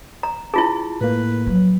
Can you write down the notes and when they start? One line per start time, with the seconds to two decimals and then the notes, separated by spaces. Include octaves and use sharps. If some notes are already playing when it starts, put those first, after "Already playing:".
0.23 A#5
0.54 E4 F4 G#4 A5
1.01 A2 A#3 B4
1.47 F3 F#3